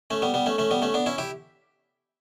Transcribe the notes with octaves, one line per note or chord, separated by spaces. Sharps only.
A3 C#4
G3 B3
G3 B3
A3 C#4
A3 C#4
G3 B3
A3 C#4
B3 D4
C#4 E4
E4 G4